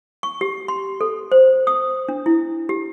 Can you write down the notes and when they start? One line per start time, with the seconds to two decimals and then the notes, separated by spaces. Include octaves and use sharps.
0.23 C#6
0.41 G4
0.68 C6
1.01 A4
1.32 C5
1.67 D#6
2.09 D4
2.26 E4
2.69 G4